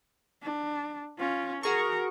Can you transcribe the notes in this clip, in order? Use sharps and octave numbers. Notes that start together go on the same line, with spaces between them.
D4
C#4 F4
F#4 G#4 A#4 C#6